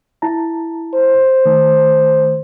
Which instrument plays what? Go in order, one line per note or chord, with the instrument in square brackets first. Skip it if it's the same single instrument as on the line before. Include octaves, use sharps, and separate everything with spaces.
[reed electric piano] E4 A5 A#5
[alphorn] C5
[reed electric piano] D#3 A3